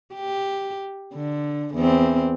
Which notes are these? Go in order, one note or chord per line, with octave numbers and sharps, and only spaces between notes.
G4
D3
E2 C4